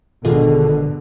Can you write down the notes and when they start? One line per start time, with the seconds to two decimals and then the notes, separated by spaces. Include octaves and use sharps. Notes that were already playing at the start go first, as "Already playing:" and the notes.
0.25 G#1 B2 D3 F4 G#4 A4 D#5